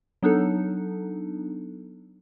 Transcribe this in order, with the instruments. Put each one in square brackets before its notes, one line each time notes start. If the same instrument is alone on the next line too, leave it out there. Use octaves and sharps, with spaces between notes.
[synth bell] F#3 B3 D4 D#4 A4